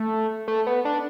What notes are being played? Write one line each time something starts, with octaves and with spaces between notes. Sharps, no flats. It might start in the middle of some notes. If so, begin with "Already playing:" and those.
Already playing: A3
A3
B3
D4